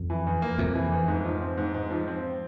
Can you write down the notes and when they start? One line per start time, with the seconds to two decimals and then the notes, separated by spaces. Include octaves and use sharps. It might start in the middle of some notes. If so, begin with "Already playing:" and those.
Already playing: F2
0.10 E3
0.27 E2
0.42 A#3
0.58 F2 C3
0.75 E3
0.92 E2
1.08 G#2
1.25 F3
1.42 C4
1.57 G#2
1.74 G#2
1.90 F3
2.08 C4